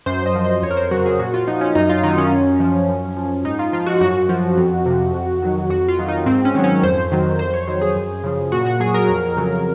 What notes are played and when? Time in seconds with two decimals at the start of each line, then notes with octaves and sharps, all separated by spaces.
0.06 F#2 C5
0.26 D#5
0.35 F3
0.45 D#5
0.62 F2 C#5
0.71 A#4
0.77 C5
0.91 C#3 F#3 F#4
1.06 G#4
1.19 A#2 F#4
1.34 F4
1.47 F3 D#4
1.61 C#4
1.75 F#2 D#4
1.89 F4
2.03 D#3 F#3 D#4
2.18 C#4
2.32 F#2
2.60 F3
2.88 F#2
3.16 F3
3.45 G#2 D#4
3.59 F4
3.73 F3 F4
3.86 F#4
4.01 F#2 F#4
4.29 F3
4.57 F2
4.86 C3 F3
5.14 F2
5.42 D#3 F#3
5.70 F2 F#4
5.88 F4
5.99 D#3 F#3
6.08 D#4
6.26 G#2 C4
6.45 C#4
6.55 D#3 F#3
6.64 C#4
6.83 F2 C5
7.12 D#3 F#3
7.39 F2 C5
7.54 C#5
7.68 D#3 F#3 C5
7.81 G#4
7.96 F#2
8.23 C#3 F3
8.52 A#2 F#4
8.66 F#4
8.80 F#3 G#4
8.94 A#4
9.09 F2
9.37 C#3 F#3